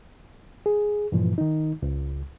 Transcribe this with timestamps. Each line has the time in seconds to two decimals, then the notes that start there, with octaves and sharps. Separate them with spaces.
0.66 G#4
1.12 G2 A#2 E3 F3
1.38 D#3 D#4
1.82 C#2